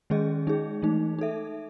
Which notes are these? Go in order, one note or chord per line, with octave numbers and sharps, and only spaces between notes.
D#3 G#3 C#4 G#4 D#5
G#3 D#4 G#4
E3 A3 D#4
D#4 A4 E5